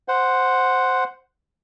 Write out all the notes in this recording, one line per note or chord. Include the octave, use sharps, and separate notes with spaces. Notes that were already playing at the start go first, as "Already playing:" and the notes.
C5 F#5